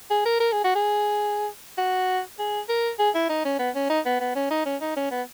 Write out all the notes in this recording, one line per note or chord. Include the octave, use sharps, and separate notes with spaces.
G#4
A#4
A#4
G#4
F#4
G#4
F#4
G#4
A#4
G#4
E4
D#4
C#4
B3
C#4
D#4
B3
B3
C#4
D#4
C#4
D#4
C#4
B3